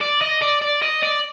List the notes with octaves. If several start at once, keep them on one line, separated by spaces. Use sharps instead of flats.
D5
D#5
D5
D5
D#5
D5